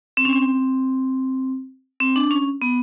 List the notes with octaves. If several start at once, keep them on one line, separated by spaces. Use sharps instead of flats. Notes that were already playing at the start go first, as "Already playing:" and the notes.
C4
C#4
C4
C4
D4
C#4
B3